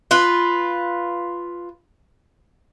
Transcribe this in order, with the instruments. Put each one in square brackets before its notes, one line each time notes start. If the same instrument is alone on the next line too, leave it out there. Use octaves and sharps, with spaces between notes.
[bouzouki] F4 B4